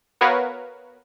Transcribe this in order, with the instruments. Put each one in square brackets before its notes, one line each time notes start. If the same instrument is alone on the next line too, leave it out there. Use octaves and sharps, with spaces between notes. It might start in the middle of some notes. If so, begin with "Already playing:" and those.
[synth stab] B3 F#4 A#4 B4 C#5 F5